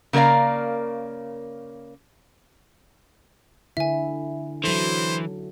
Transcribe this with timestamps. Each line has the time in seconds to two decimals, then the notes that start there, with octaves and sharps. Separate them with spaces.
0.13 C#3 A#3 A#4 D5 F5
3.77 D3 E4 E5 G#5
4.64 E3 F#3 A4 C5